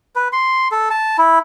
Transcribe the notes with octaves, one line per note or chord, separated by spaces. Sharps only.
B4
C6
A4
A5
E4